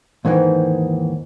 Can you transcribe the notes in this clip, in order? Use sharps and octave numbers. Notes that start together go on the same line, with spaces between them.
D#2 G#2 D#3 E3